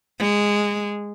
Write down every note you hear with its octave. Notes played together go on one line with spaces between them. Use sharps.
G#3